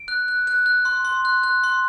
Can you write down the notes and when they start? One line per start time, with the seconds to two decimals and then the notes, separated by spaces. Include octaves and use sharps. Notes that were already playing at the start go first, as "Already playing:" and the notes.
Already playing: D7
0.08 F#6
0.28 F#6
0.47 F#6
0.66 F#6
0.85 C6
1.05 C6
1.25 F#6
1.43 F#6
1.64 C6